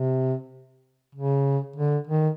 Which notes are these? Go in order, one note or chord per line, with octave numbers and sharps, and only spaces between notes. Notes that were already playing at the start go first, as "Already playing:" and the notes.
Already playing: C3
C#3
D3
D#3